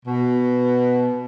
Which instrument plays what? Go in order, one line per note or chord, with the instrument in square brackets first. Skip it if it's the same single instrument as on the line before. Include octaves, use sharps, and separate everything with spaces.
[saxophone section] B2